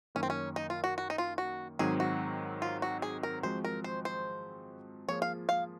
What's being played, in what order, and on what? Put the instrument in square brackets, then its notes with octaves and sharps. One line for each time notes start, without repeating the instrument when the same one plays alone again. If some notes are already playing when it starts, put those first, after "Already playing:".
[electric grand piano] F#2 D#3 A#3 [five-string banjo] C#4
[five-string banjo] C4
C#4
D#4
F4
F#4
F#4
D#4
F4
F#4
[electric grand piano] G#2 D#3 F#3 C4 [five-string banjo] G#4
[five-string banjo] F#4
F4
F#4
G#4
A#4
[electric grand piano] F3 G#3 C4 F#4 [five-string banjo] C5
[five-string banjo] A#4
C5
C5
[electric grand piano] F3 A#3 F4 G#4 [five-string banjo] C#5
[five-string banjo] F5
F5